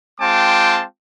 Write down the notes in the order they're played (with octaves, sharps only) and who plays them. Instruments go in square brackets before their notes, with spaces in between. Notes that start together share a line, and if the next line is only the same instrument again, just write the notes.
[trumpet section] G#3 C4 F4 G5 A5 D6